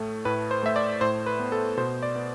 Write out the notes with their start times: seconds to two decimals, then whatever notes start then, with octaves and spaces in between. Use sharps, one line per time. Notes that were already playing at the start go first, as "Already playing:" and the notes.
Already playing: A2 A3
0.25 A2 B4
0.51 C5
0.63 A3 E5
0.76 D5
1.01 A2 C5
1.26 B4
1.40 B3
1.52 A4
1.77 B2 C5
2.03 D5
2.16 B3